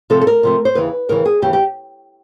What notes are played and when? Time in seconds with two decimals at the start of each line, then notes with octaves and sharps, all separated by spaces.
0.10 C3 F3 A3 A4
0.21 A4
0.27 A#4
0.43 C3 F3 A3
0.65 C5
0.75 D#2 C#3 E3 B4
1.09 D#2 C#3 E3 A#4
1.26 G#4
1.42 D#2 C#3 E3 G4
1.53 G4